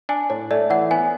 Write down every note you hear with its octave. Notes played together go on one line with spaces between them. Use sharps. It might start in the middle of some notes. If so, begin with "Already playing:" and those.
D4 G#5
A2 C#5
A3 D5
E3 F#5
B3 G#5